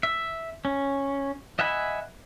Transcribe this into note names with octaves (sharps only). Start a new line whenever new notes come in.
E5
C#4
D#5 E5 F#5 G#5 B5